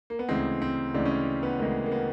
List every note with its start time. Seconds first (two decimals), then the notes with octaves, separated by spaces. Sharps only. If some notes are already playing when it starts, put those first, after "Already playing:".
0.10 A#3
0.19 B3
0.28 D2 C#3 E3 G#3 C4
0.62 C4
0.94 D2 C#3 E3 G#3 D4
1.05 C#4
1.11 D4
1.43 B3
1.59 D2 C#3 E3 G#3 A#3
1.86 A#3
1.92 B3